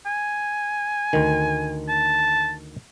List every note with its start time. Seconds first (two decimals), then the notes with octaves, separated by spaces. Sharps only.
0.06 G#5
1.13 D2 D#3
1.88 A5